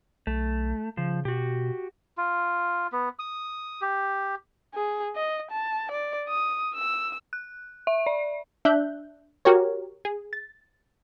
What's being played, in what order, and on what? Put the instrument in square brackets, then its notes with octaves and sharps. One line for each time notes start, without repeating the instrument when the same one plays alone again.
[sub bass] B1 [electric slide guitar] A3
[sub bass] C#3 [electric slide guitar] F3
[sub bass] B2 [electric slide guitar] F#4 G4
[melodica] F4
B3
D#6
G4
[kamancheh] G#4
D#5
A5
D5
D#6
E6
[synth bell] F#6
E5
D5
[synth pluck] D4 E5 F#6 G6
F#4 G4 A#4 C#5
G#4
A6